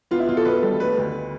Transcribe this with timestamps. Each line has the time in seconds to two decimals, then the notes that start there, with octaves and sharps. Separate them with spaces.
0.11 B3 F4
0.19 E4
0.28 B2 F4
0.37 A4
0.45 B2 B4
0.62 G3 A4
0.80 A3 B4
0.98 D2